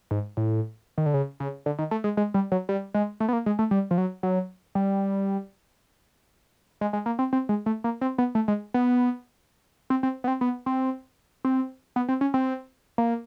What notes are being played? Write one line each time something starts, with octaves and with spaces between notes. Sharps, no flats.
G#2
A2
D#3
D3
C#3
C#3
D3
D#3
A3
G#3
G#3
G3
F#3
G3
G#3
A3
B3
A#3
G#3
A3
G3
F3
F#3
F#3
G3
G#3
G#3
A#3
C4
C4
G#3
A3
A#3
C4
B3
A3
G#3
B3
C4
C4
B3
C4
B3
C4
C4
B3
C4
C#4
C4
A#3